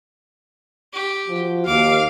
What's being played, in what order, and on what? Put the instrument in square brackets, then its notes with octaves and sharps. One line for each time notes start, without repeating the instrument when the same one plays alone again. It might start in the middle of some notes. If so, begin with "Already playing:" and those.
[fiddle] G4
[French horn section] F3 F#4
[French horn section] D#2 [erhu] F5 [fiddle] D6